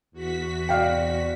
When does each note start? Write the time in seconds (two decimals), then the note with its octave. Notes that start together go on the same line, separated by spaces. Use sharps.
0.12 E2 F#4 B6
0.69 C3 D5 F5 G5